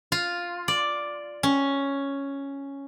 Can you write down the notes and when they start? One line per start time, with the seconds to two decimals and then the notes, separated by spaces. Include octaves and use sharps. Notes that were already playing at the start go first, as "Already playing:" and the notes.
0.12 F4
0.68 D5
1.43 C#4